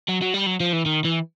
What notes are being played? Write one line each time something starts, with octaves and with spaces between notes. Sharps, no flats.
F#3
F#3
G3
F#3
F3
E3
D#3
E3